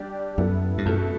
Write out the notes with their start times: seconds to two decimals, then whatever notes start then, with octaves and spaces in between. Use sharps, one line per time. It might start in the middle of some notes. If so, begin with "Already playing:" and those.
Already playing: G3 D4 G4 D5
0.38 F#2 B3 E4 A4
0.78 G2
0.85 F#2 B2 A3 E4